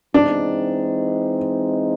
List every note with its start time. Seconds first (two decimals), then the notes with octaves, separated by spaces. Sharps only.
0.14 E3 G#3 C4 D4 D#4